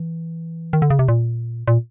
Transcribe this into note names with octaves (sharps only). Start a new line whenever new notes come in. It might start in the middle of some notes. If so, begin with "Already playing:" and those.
Already playing: E3
D#3
D3
C#3
C3
A#2
A#2